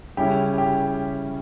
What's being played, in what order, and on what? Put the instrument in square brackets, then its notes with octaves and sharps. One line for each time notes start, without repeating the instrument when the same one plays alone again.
[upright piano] C#3 G3 C#4 E4 [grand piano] G4
[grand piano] G4